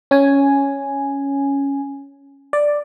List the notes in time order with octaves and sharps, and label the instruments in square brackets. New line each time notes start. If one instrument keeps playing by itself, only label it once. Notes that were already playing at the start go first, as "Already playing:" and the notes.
[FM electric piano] C#4 G#5
D5